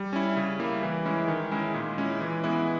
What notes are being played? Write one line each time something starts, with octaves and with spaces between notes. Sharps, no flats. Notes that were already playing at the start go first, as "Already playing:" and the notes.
Already playing: G3
C#4 E4
C#3
G3 A#3 E4
E3
G#3 C#4 E4
D#3
G#3 C#4 E4
A#2
G#3 C#4 E4
E3
G#3 B3 E4